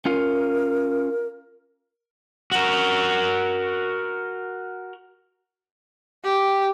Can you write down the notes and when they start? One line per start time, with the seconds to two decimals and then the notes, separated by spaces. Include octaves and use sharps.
0.05 C#4 F4 A#4 F5
2.52 F#4 A#4
6.24 G4